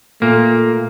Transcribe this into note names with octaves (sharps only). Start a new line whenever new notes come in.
A#2 A3 A#3